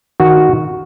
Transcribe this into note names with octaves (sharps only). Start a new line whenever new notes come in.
D#3 F#4